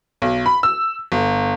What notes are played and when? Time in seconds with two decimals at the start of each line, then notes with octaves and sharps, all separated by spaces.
0.22 B1
0.46 B5
0.63 E6
1.12 G1